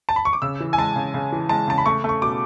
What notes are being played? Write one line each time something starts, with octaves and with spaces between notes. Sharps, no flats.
A5
B5
C#6
D6
C#3 E6
E3
G#5
G#3 A5
C#3
C#3
E3
G#3 A5
C#3 A5
B5
A3 C#6
A3
C#6
B2 D6